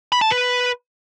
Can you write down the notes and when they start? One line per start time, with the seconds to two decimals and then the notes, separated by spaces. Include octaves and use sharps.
0.12 B5
0.21 A5
0.30 B4